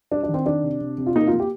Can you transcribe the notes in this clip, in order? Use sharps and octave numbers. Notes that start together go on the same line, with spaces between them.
G3 D4
D4
D#3
C4
D#3 D4
C3
C3
C3
F4
A#3 D#4
F4
A#3
G4